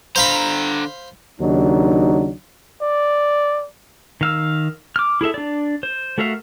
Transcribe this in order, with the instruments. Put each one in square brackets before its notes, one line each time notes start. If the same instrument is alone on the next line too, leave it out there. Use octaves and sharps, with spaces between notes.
[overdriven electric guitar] D3 A#5 [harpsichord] C5 F5 B5
[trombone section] D#2 C#3 F#3 D4 D#4
[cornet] D5
[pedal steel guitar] D#3 F5 E6
D6 F6
E4 G#4 A4 E5
D4 D5
C5
A3 F#4 A#4 E5 F5